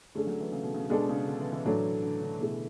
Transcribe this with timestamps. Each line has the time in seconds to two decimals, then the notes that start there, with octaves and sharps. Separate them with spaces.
0.15 D3 A3 C#4 D4 G#4
0.27 F#3
0.41 E3
0.52 C#3
0.63 B2
0.74 C#3
0.89 B2 G#3 D4 A4
1.09 C#3
1.27 D3
1.40 E3
1.52 E3
1.65 A2 F#3 A3 D4 A4
2.02 D3
2.21 D3
2.39 B2 A3 E4 G#4